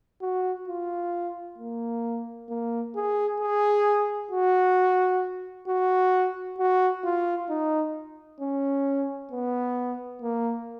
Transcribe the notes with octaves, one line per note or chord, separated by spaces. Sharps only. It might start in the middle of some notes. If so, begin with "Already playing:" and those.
F#4
F4
A#3
A#3
G#4
G#4
F#4
F#4
F#4
F4
D#4
C#4
B3
A#3